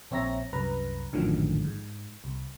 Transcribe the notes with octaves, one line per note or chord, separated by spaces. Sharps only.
A#1 C4 C#5 E5 A#5 A#6
C2 F#2 B4 A#5
A#1 F#2 A2 D3 D#3 F3
G#2
C2